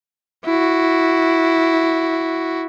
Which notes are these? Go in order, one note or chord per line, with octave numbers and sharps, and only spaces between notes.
E4 F#4